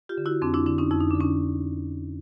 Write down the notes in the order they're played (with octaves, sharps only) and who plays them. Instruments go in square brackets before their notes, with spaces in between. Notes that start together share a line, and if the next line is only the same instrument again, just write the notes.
[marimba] F4 G4
D3
E4 F#4
F2 C4 D4
D4 E4
D3 D4 E4
C#4 D#4
F2 E4
D#4
D3 D4
C#4 D#4